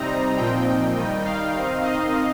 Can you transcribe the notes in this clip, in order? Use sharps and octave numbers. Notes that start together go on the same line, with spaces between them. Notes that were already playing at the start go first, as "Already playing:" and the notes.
Already playing: C3 G3 C4 D#4 A#5
A#2 F3 C4 D#4 G5
D#3 G3 D#4
F5
D#3 C4 D#4
D#5